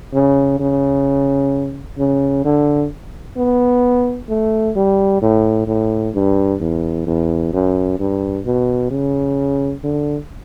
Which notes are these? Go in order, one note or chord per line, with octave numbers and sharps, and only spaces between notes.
C#3
C#3
C#3
D3
B3
A3
G3
A2
A2
G2
E2
E2
F#2
G2
B2
C#3
D3